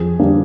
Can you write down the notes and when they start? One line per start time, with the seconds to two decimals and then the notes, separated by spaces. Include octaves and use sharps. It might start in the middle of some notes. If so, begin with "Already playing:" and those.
Already playing: F2 G#4
0.19 D3 G3 A#3 D4